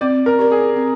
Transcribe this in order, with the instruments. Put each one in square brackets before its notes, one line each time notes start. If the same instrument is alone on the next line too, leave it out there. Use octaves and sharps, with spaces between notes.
[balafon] C4 [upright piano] D5
[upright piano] A#4
[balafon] G4 A#4 D5
[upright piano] G#4
[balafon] C4